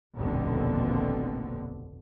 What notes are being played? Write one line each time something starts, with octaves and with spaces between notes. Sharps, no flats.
F1 A#1 D#2 B2 D3 C4